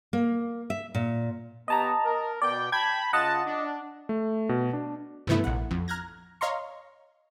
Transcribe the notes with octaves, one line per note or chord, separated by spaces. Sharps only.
A#3
E5
A#2
B3 G4 C#5 D#5 A5 A#5
A#4
B2 D5 G5
G5 A5 B5 G#6
C#3 F4 D#5 F#5 A5
D4
A3
B2
D4
G2 C3 E3 A3 B3 E4
A#1 F#5
F2
A#5 F6 F#6 G#6 A#6
C#5 D#5 F5 A#5 C6 C#6